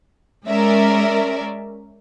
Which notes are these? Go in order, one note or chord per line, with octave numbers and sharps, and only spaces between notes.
G#3 C#4 A#4 D5 E5